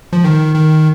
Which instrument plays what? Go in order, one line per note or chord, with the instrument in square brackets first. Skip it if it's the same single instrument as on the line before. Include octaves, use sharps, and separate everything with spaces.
[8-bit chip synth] F3
D#3
D#3